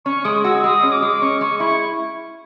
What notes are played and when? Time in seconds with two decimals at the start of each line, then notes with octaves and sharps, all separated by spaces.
0.05 C#4 C#6
0.25 G#3 D#6
0.44 F#4 E6
0.64 G#3 D#6
0.83 C#4
0.92 D6
1.02 G#3
1.21 C#4 C#6
1.41 G#3 C#6
1.60 E4 C#6